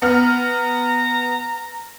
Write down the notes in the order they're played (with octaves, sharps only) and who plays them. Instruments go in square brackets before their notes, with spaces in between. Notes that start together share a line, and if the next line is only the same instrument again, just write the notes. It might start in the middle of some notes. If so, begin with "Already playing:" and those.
[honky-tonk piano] B3 F6 [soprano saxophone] A#5